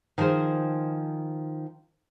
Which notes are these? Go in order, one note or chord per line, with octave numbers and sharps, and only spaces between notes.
D#3 F3 D#4 G#4 C5